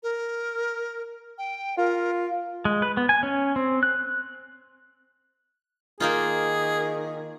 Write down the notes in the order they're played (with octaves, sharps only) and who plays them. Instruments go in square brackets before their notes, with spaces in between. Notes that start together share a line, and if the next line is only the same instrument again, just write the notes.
[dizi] A#4
G5
[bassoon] F4 [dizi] A#4
[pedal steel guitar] G#3
B4
B3
G#5
C#4
C4
F#6
[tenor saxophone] D#3 [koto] A#3 D#4 F4 [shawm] G#4